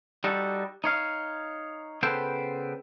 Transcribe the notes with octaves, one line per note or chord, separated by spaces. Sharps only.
G3 D#4 F#4 A4
D#4 C#5 F5
C#3 B3 A4 B4 C5 G5